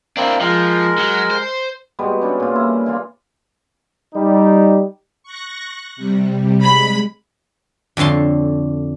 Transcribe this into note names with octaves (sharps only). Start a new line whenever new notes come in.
A#3 C4 D4 E4
F3 G#3 A#4
F#3
C5
G3 G#3 B3 F#4
C#4 D4 E4
A#2 F4
G3 E4
E3 A#3 F4
G3 D#4
C#6 F#6 A#6
C3 G3
G#3 B5
F2 D3 C#5 A5 C6